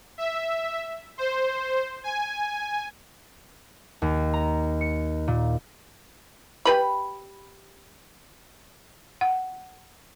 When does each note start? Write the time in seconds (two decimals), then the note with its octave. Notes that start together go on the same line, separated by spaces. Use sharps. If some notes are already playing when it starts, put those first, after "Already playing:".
0.18 E5
1.18 C5
2.04 G#5
4.02 D#2
4.34 A#5
4.81 C#7
5.28 A#2
6.65 G4 B4 B5
9.21 F#5